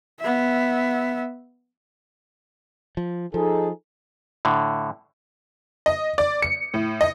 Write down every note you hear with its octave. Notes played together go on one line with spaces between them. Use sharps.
B3 E5
F3
F3 D#4 G#4 A4
A2 D3
D#5
D5
C#7
A2
D#5